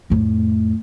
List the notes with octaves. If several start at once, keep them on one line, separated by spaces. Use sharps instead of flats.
F2 A2